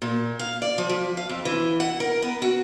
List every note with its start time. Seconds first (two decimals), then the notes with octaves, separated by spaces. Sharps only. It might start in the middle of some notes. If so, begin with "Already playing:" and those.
0.02 A#2
0.39 F5
0.62 D5
0.78 F3
0.89 F3
1.17 F5
1.29 F2
1.45 E3
1.80 F#5
2.00 A#4
2.22 B3
2.42 F#4